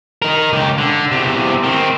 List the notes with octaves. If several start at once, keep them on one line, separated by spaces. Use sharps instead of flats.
D#4 A#4
C#2 G4
D3
E2 C3
D#3 C4